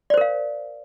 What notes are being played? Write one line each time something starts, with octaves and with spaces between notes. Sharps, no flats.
A#4 C5 D5 F5